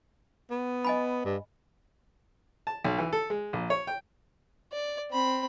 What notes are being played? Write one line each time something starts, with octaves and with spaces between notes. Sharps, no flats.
B3
D#5 G#5 B5
G2
A5
B1
E3
A4
G#3
A#1
C#5
G5
D5
C4 B5